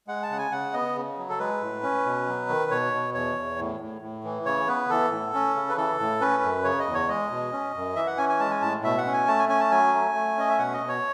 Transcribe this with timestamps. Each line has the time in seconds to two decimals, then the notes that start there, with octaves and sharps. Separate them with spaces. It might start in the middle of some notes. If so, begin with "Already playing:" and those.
0.08 G#3 F#5
0.23 A5
0.30 C#3 F#5
0.38 G#5
0.52 C#3 F#5
0.74 B3 D#5
0.95 C#3
1.18 F#3
1.29 A4
1.40 G#3 B4
1.61 A2
1.83 C#4
2.05 B2
2.27 F#3
2.49 D#3
2.71 B2 C#5
2.93 B2
3.14 E2 C#5
3.36 E2
3.59 A2
3.80 A2
4.02 A2
4.24 E3
4.45 C#3 C#5
4.68 B3 B4
4.90 E3 A4
5.11 A2
5.34 C#4
5.55 C#3
5.69 B4
5.77 E3 A4
6.00 A2
6.21 C#4 B4
6.42 F#2
6.64 C#3 C#5
6.79 D#5
6.86 E2
6.94 C#5
7.08 G#3 D#5
7.30 B2
7.52 C#4
7.75 F#2
7.95 E3 E5
8.07 F#5
8.18 C#4 G#5
8.29 G#5
8.40 G#3 A5
8.51 G#5
8.61 A2 A5
8.84 B2 E5
8.98 F#5
9.06 C#4
9.13 G#5
9.28 A3 A5
9.39 G#5
9.49 C#4 G#5
9.60 A5
9.71 F#3 G#5
9.93 A3
10.14 A3
10.37 C#4 D#5
10.49 E5
10.58 B2 F#5
10.73 D#5
10.80 B2
10.88 C#5